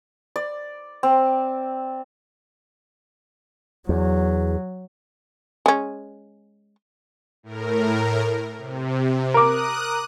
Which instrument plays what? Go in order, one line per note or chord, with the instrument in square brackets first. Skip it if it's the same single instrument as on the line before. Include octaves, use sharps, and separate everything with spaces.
[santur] D5
C4
[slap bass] E2 [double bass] F#3
[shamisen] G#3 C#4
[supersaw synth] A2 A#4
C3
[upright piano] A#4 D6 [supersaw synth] D#6 F#6